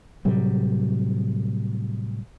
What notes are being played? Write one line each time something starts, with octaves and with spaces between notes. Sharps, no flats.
A2 C3 F#3 G3